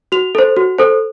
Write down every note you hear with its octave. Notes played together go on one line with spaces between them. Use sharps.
F#4 F7
A4 C5
F#4
A4 C5